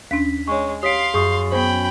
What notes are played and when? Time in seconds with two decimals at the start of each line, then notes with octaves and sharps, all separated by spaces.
0.11 D#2 C#4 D4 B6
0.48 G#3 C#5 C#6
0.83 G4 C#5 F5 C6 D#6 B6 D7
1.14 F#2 G#4 C#6 D#6
1.52 B3 C#4 C5 G5 B5